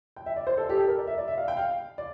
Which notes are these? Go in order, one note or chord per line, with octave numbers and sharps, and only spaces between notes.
G5
E5
D5
C5
A4
G4
A4
A#4
D5
E5
D5
E5
F5
G5
F5
D5